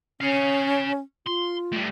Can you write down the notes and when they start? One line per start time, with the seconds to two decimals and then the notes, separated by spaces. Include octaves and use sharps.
0.21 C#4 C#5 F5
1.26 F4 C6
1.72 A2 G3